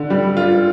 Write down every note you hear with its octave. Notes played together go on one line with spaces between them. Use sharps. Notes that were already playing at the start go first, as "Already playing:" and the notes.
Already playing: D3
G3
F4